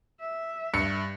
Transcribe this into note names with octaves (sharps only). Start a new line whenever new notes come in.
E5
G2 C#7